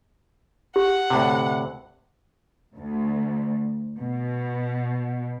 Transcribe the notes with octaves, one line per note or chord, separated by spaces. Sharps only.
G4 F#5
D2 A2 C3
D2
B2